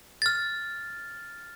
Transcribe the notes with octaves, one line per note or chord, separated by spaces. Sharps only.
F6 A6